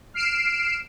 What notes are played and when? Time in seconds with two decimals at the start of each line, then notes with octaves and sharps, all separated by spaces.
0.14 F6 C7 D7 E7